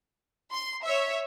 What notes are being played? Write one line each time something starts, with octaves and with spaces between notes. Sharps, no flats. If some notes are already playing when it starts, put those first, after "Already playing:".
C6
C#5 E5